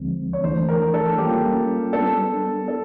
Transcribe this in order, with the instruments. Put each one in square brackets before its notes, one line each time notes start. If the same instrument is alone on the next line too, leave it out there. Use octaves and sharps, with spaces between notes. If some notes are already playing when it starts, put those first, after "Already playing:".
Already playing: [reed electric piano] D2 D3 F3 G#3 C4
[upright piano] C#5
[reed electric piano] E3 A3 D4 [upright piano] C5
[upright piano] A#4
A4
[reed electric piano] G3 A#3 C#4 F4 [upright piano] G4
[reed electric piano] G3 B3 D4 [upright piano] A4
[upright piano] A4